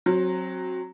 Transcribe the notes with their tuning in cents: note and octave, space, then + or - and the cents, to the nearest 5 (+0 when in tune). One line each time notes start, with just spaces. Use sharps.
F#3 -5 C4 +25